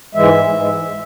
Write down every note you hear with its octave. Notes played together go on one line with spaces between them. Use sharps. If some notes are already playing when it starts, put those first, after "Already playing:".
G#2 E3 G#3 E5
G#2 E3 G#3